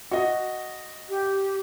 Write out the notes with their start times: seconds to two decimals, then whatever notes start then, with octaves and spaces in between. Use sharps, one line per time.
0.11 F#4 D#5
1.09 G4